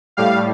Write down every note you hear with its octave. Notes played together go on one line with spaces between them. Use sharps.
A2 G3 F5